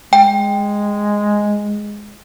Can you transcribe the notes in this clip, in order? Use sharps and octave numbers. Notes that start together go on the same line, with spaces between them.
G#3 G5